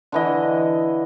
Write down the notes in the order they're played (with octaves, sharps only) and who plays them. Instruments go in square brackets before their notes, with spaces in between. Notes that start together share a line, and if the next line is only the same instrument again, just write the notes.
[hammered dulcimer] D3 E3 D#5